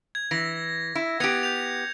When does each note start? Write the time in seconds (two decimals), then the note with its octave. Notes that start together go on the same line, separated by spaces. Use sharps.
0.15 G#6
0.31 E3 A#6
0.95 E4
1.20 B3 G4 G#6 C#7 F7
1.43 G6 F7